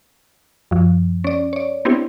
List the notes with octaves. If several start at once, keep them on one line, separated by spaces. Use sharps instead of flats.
F#2 F3
C#4 D5
C#5 D5
B3 C4 D4 E4 G4